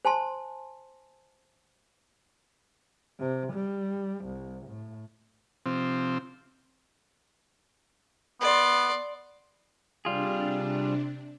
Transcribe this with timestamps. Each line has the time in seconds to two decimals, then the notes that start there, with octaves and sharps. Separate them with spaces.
0.05 C5 G#5 A5 C6
3.20 C3
3.53 G3
4.25 C2
4.67 A2
5.66 C3 F3 C4
8.41 B3 D5 C6
10.05 C3 G3 D4 F4 G#4